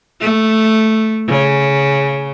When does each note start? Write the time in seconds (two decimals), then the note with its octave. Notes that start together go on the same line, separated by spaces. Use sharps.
0.21 A3
1.27 C#3